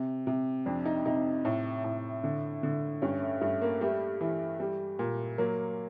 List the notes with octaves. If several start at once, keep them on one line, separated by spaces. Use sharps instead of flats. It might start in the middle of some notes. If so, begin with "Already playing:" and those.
Already playing: C3
C3
F2 D4
D#4
C3 D#4
A2
A2
D3
D3
G2 C#4
A3
G2 A3
A#3
G3 A3
E3
G3
A#2
F#3 A#3